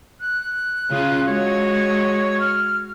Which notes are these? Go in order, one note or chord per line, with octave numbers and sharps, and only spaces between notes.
F#6
C#3 C#4 F4
G#3 F#4 C#5
F6